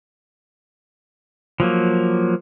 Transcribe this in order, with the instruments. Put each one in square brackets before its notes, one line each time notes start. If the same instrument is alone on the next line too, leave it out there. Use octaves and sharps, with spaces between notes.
[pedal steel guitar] F3 F#3 A#3